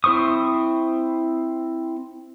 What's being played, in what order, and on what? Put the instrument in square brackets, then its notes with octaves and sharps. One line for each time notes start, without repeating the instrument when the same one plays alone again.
[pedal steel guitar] C4 E4 C5 C#6 D#6